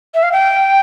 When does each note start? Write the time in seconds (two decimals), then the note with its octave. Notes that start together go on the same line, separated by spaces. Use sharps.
0.15 E5
0.23 F5
0.32 G5